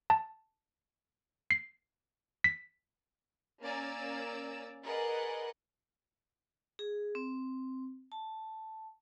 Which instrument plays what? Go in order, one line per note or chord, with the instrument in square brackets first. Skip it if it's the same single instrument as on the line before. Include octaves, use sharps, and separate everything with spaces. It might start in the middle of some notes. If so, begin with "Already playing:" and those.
[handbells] A5
C7
B6
[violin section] A#3 C#4 D5 G#5 A#5 E6
G#4 A#4 B4 D5 D#5 F#5
[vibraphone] G#4
C4
A5